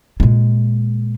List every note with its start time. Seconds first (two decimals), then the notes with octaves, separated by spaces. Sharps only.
0.20 A#2 G#3